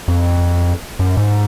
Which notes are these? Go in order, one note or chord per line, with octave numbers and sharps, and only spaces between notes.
F2
F#2
G#2